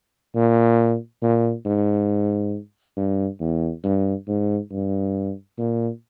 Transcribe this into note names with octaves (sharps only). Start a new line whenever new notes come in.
A#2
A#2
G#2
G2
E2
G2
G#2
G2
A#2